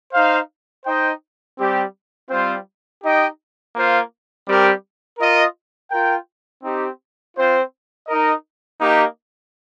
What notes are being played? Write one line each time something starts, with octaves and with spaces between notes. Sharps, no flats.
D#4 C5 F5
D#4 C5 D#5 G5
G3 C4 G4
G3 C4 F4 C5
D#4 G4 D#5 G5
A#3 F4 C5
G3 C4 G4 A#4
F4 A#4 D#5
F4 A#4 G5
C4 D#4 G4
C4 F4 C5
D#4 A#4 D#5
A#3 D#4 G4 D#5